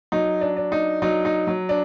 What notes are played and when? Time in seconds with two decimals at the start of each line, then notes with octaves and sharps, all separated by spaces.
0.12 F#3 D#4
0.41 D4
0.56 D4
0.72 D#4
1.02 F#3 D#4
1.25 D#4
1.47 F#3
1.69 D4